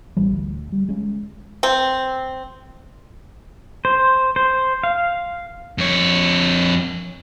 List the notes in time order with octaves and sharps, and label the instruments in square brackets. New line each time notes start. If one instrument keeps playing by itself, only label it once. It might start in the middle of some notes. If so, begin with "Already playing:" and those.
[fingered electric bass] A1 E3 G3
D2
G3
G#3 C#4
[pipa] C4
[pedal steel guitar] C5
C5
F5
[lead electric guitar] F2 C#5